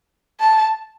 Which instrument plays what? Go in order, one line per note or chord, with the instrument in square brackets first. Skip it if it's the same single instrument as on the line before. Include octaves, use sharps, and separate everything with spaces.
[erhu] A5